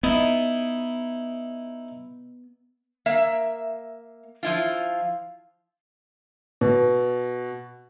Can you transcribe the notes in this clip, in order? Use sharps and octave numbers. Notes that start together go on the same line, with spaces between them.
B3 D#4 E4 D#5
A#3 E5
F3 E4 F4
B2